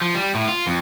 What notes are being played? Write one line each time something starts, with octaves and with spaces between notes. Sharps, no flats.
F3
G3
A2
F4
F2